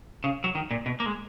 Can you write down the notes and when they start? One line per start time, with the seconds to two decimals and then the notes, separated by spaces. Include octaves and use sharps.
0.24 C#3
0.44 F#3
0.55 D#3
0.71 A#2
0.86 B2
1.00 A#3
1.06 G#3